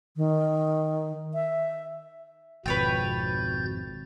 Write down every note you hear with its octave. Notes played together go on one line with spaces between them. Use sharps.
D#3
E5
G#1 F2 B2 B4 C#5 G5 G6 A6